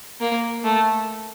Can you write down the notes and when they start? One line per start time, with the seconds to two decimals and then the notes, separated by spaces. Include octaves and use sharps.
0.21 A#3
0.64 A3